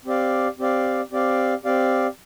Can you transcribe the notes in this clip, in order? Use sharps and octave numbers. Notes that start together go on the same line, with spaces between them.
C4 G4 D5 F5
C4 G4 D5 F5
C4 G4 D5 F5
C4 G4 D5 F5